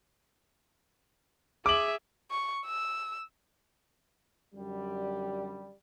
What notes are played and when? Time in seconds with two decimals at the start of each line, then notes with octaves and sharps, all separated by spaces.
1.66 G#4 E5 D6 F#7
2.31 C#6
2.66 E6
4.55 F#2 D3 G3